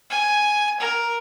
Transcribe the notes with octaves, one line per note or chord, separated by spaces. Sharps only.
G#5
A#4